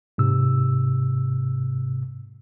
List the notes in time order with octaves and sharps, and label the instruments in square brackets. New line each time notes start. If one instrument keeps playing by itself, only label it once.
[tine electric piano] G#2 C3 E6